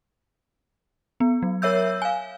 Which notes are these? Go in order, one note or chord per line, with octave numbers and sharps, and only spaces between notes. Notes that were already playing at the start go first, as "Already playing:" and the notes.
B3
F#3
A#4 C#5 E5 E6 G6
F5 G#5